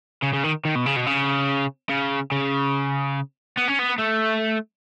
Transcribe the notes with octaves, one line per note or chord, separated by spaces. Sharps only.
C#3
C#3
D#3
D#3
B2
C#3
B2
C#3
C#3
C#3
B3
C#4
B3
A3